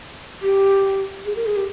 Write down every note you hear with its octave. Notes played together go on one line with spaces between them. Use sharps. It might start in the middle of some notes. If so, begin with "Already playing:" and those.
G4
G#4
A#4
G#4
G4